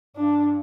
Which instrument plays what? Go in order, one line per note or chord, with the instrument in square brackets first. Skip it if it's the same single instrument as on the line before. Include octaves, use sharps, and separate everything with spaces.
[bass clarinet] G2 [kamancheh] D4